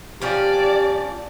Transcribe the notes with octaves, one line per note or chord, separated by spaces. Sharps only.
F3 C#4 D4 G4 D5